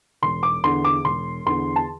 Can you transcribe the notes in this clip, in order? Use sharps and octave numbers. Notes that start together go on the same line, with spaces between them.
E1 C6
D6
E2 D3 C6
D6
E1 C6
E2 D3 C6
A5